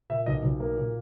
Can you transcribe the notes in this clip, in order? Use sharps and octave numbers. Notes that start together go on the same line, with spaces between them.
A#2 E5
B1 D#5
B1
A#3
A#2